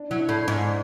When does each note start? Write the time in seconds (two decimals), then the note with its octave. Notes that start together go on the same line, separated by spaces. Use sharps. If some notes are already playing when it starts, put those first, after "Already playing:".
Already playing: D4
0.10 F#3 E4
0.20 D4
0.29 A2
0.47 G#2 D4